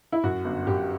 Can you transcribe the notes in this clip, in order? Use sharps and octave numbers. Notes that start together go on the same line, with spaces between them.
E4
F#2 F#4
G1
F#2 G4